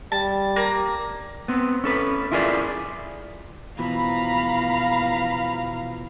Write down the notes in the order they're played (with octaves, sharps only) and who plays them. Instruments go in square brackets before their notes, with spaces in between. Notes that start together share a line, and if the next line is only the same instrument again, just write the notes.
[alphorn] G3 [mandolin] A5
[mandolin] A#3 A#5
[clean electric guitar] B3 C4
C#4 A4 B4
E4 F4 G#4 A#4 B4 D5
[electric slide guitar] B2 E3 F3 [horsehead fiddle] F5 A#5 [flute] B5